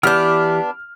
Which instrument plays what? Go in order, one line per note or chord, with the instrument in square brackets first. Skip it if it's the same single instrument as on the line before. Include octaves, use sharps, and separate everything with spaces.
[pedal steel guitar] E3 G4 G6 [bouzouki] B3 D4 [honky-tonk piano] F6